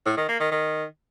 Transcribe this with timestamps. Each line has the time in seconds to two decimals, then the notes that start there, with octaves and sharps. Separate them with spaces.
0.06 A2
0.17 D#3
0.28 A#3
0.40 D#3
0.51 D#3